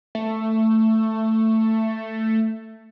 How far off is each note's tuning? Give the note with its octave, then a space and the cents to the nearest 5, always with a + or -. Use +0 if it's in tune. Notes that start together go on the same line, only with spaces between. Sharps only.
A3 +10